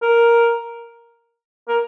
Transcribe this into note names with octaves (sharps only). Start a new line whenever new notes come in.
A#4
A#4